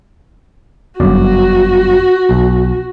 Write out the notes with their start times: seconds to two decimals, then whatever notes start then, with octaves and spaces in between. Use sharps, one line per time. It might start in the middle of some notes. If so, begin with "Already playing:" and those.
1.00 G1 F#2 F#4 D5
2.29 B1